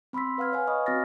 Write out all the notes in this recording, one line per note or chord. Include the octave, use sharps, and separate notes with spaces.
C4 B5 C6 E6 B6
B4 F5 F#5 F6 G#6
B4 C#5 F5 F#5 G#5
C#5 D#5 F5 B5 C#6 D#6
C4 F#4 G#5 F6 A6 A#6